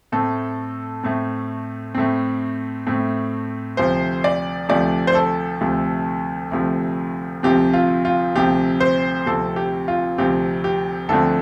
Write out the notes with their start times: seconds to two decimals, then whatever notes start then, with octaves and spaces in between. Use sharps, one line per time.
0.12 A2 A3 C4 A4
1.03 A2 A3 C4
1.94 A2 A3 C4
2.87 A2 A3 C4
3.77 D2 C3 F3 A3 C5
4.24 D5
4.69 D2 C3 F3 A3 D5
5.07 C5
5.15 A4
5.61 D2 C3 F3 A3
6.52 D2 C3 F3 A3
7.43 D2 C3 F3 C4 G4
7.73 F4
8.05 F4
8.35 D2 C3 F3 C4 G4
8.80 C5
9.26 D2 C3 F3 C4 A4
9.56 G4
9.88 F4
10.18 D2 C3 F3 C4 G4
10.64 G4
11.09 D2 D3 F3 A3 C4 A4